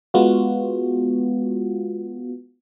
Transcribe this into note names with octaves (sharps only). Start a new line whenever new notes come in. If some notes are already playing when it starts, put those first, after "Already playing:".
G#3 B3 F4 F#4